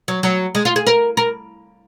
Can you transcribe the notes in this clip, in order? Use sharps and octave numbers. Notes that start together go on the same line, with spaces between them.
F#3
F#3
G#3
F4
G#4
A#4
A#4